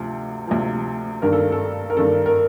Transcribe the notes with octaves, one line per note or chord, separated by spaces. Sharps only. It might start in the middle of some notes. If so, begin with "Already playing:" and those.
Already playing: D2 C3 F3
D2 C3 F3
G2 D#3 A#3 D4 A#4
A4
A4
A#4
G2 D#3 A#3 D4 A4
A#4